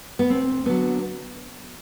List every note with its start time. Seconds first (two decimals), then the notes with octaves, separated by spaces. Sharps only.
0.19 B3
0.30 D2 C4
0.65 D3 F#3 B3